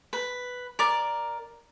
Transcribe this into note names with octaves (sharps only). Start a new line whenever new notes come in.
B4
A#4 D5